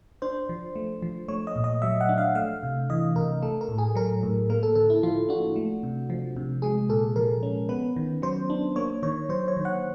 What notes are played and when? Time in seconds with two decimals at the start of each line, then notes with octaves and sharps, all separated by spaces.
0.22 D4 C5
0.49 F3
0.76 A3
1.02 F3
1.28 A3 C#5
1.47 D#5
1.56 A#2
1.64 D#5
1.82 F#3 E5
2.01 F#5
2.09 D4
2.18 F5
2.35 A3 F5
2.63 C3
2.90 E3 D#5
3.16 C3 A#4
3.42 A3 A4
3.61 A#4
3.69 A2
3.78 G#4
3.95 F#3 A#4
4.23 A2
4.50 A#3 A#4
4.63 A4
4.75 D3 A4
4.90 E4
5.03 F3 F4
5.29 D4 F#4
5.56 A3
5.83 C3
6.10 F3
6.36 C3
6.62 G#3 G#4
6.89 A#2 A4
7.16 F3 A#4
7.43 C#4
7.69 B3 B4
7.96 D#3
8.22 F#3 C5
8.50 D4
8.76 A#3 C#5
9.03 D#3 C#5
9.29 F#3 C5
9.48 C#5
9.57 D#3
9.65 F#5